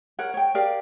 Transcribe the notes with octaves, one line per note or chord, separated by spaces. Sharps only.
A#4 C#5 F#5
C#5 G5
G4 A#4 D5 F5